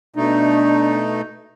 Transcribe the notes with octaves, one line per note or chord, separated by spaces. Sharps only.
B2 A3 D4 D#4